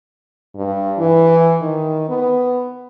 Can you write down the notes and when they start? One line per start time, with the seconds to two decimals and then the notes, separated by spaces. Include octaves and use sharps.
0.55 G2
0.98 E3
1.62 D#3
2.09 B3